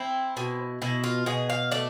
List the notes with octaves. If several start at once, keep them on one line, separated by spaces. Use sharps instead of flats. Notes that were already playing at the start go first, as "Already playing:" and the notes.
Already playing: C4 E4
B2
B2 E4
F4
B2 G#4
F5
A3 D5